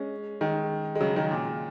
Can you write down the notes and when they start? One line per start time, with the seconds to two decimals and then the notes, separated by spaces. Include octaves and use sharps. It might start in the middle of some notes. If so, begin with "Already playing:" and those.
Already playing: G#3 C#4
0.41 D#3 G#3
0.95 G#3
1.00 C#3 F#3
1.16 D#3 G#3
1.31 A#2